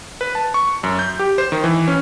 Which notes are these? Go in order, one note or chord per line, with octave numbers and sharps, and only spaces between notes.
B4
A5
C#6
F#2
G6
G4
C5
D#3
E3
C#4